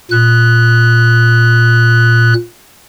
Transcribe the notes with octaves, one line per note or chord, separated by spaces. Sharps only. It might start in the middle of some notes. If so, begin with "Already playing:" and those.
A#2 F#6